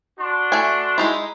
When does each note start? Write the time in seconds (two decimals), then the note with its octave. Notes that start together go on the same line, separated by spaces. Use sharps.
0.19 D4 F#4 C6
0.52 A3 G#5
0.98 G#3 D#4 E4